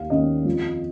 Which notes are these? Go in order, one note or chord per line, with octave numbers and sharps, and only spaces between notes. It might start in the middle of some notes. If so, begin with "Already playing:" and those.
Already playing: D#2 F5
D#3 A#3 C#4 D#5
F2